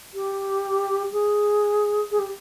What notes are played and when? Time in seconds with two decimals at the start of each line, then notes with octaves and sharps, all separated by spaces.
0.14 G4
1.12 G#4
2.11 G#4
2.19 G4